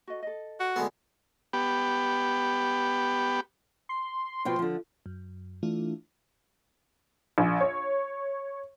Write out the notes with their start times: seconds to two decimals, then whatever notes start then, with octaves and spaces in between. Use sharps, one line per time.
0.07 F#4 A4 D#5
0.23 A4 D#5
0.60 F#4
0.76 D2 G#3 B3 A4 A5
1.53 B3 G4
3.89 C6
4.45 B2 F3 G5
4.59 D3 F3
5.06 F#2
5.63 E3 A3 D4 E4 F4
7.38 A#1
7.61 C#5